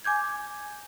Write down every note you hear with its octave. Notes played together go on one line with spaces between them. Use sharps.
G#5 D6 G6 G#6